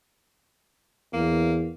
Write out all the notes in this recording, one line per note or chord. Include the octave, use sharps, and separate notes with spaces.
E2 A#3